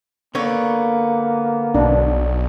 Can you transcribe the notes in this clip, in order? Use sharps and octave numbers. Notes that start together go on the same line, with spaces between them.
D3 A#3 B3 C#5
B1 D4